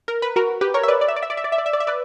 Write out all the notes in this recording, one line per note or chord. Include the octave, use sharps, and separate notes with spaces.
A#4
B4
F#4 A#4
G4 B4
A#4 C#5
E5
B4 D5
D5
E5
D5
E5
D5
E5
D5
E5
D5
E5
D5
E5
B4 D5